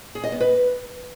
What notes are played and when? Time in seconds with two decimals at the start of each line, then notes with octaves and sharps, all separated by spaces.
0.15 G#4
0.24 D#5
0.32 B3
0.40 B4